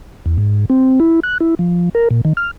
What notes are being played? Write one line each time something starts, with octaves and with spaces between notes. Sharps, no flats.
E2
G#2
C4
E4
F#6
E4
F3
A#4
A#2
D#3
F6